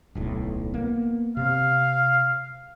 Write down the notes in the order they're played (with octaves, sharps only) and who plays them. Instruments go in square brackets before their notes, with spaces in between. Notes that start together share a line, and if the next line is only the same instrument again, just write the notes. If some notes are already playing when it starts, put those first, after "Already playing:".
[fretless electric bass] D1 B1 A2
A#3 B3
[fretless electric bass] C3 [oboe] F5